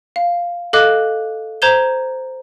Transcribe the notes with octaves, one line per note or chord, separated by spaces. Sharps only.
F5
A4 D#5 F5 D6 F#6
C5 A#5 G6 G#6 E7 G7